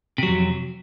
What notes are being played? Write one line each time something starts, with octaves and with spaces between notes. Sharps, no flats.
F2 C3 F#3